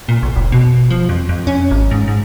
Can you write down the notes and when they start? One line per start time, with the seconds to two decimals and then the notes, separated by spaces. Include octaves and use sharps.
0.09 A#2
0.23 B1
0.36 F1
0.52 B2
0.90 F3
1.09 F2
1.29 F2
1.47 C#4
1.71 G#1
1.91 G#2
2.08 G#2